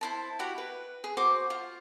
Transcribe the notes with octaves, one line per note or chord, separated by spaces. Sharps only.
E4 C5 A5
E4 F#4 G4 F#5
B4
G#4
F#4 C5 D6
F4 C5